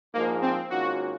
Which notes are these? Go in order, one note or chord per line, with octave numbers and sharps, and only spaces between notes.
A#1 G#2 F3 G#3 A#3
C4
G#2 D#3 A#3 C#4 F4 F#4